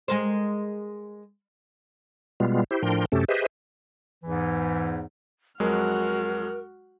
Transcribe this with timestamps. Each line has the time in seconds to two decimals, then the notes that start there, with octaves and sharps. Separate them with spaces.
0.08 G#3 A#4 C5
2.40 B2 G3 G#3 B3 F4
2.71 E4 G4 C5
2.82 A2 F3 D4 A#4 G5 C6
3.12 F#2 C3 A3 C#4 G4 A4
3.28 G4 G#4 B4 C5 D#5 E5
4.24 E2 G#2 E3
5.60 F2 F#3 G#3 F#4 A#4 F6